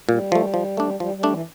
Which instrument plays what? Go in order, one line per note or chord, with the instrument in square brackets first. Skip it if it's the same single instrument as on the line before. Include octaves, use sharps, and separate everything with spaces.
[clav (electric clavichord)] A#2 [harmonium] G3
[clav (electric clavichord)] F3 A3
F3
A3 D4
[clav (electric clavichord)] F3 [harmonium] G3
[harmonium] G3
[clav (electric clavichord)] A3 D4
[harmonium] E3